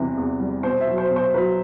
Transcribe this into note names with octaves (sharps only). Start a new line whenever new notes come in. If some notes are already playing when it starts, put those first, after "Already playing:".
Already playing: E2 C3 E3 G3
E2
G3
B2 C5
E5
F#3
C5
B2
C5
F#3 B4